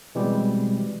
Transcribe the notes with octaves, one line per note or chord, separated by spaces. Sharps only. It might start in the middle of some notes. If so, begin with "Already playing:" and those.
B2 E3 G3 G#3 C4 G4